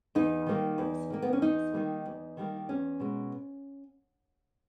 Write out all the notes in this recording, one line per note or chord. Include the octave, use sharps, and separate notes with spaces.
E2 D#4
D#3 G3 A#3
E2
D#3 G3 A#3
B3
C#4
E2 D#4
D#3 G3 A#3
E2
D#3 G3 A#3
E2 C#4
B2 G#3